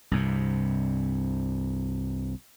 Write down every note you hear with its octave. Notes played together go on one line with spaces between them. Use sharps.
C2 G2 C3